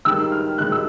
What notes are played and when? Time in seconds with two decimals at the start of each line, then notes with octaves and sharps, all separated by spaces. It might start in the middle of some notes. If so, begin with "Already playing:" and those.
0.05 G#2 D#3 G3 E6
0.32 F6
0.58 G#2 D#3 G3 F#6
0.72 E6